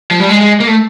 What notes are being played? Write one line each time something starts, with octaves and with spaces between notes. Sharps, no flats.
F3
G3
G#3
G#3
A#3
A3